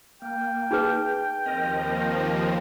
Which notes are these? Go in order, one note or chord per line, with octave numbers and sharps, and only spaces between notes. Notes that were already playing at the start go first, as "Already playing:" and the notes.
A#3 G5
D#4 G#4 B4
D#2 F3 C4 A#4 D#5